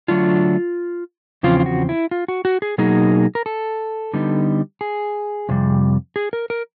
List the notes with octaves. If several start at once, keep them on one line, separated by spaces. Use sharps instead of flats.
D3 F#3 A3 D4 F4
E2 C#3 F3 C4 F4
F4
F#4
E4
F4
F#4
F#4
G#4
B2 F#3 A#3 D#4 G#4
A#4
A4
D3 G3 B3 D#4
G#4
F2 C3 G3
G#4
A#4
A#4